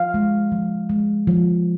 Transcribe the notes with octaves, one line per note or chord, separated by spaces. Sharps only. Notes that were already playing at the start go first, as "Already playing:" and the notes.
Already playing: F3 F5
G#3
F3
G#3
F3